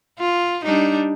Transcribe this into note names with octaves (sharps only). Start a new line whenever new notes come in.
F4
G3 D4 D#4